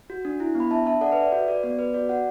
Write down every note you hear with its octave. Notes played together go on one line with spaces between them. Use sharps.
F#4
D4
E4
B3
B5
D4 E5 A5
D4 E5 A5
A4 D5 F#5
B4 E5
A4
D5
F#4 B4
F#4 D5
B3 D5
B3 B4
F#4 D5
F#4 D5 F#5